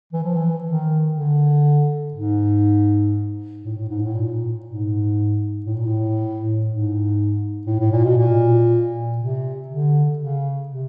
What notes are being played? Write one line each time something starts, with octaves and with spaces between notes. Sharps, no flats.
E3
F3
E3
D#3
D3
G#2
A2
A2
G#2
A2
A#2
G#2
A2
A#2
A2
G#2
A2
A2
A#2
B2
A#2
C3
D3
C#3
C3